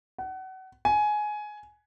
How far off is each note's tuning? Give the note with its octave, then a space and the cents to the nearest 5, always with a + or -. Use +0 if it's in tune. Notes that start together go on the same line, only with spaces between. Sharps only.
F#5 +30
G#5 +15